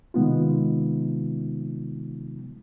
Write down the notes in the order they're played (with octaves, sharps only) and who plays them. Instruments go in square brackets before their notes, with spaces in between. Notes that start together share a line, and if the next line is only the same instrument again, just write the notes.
[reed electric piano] C3 D#3 G#3 B3 D#4 F4